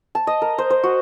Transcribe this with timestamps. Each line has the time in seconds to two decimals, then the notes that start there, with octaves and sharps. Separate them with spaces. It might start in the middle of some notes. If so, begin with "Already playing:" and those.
0.15 A5
0.27 D#5
0.42 A#4
0.58 C5
0.70 C5
0.84 F#4